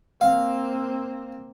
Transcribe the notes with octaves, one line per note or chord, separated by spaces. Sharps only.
A#3 C4 F5